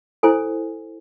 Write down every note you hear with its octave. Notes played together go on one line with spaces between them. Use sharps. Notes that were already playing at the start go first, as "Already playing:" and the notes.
E4 A4 C5 G#5